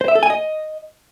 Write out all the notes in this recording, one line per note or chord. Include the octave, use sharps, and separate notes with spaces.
C5
E5
A4
G#5
D#5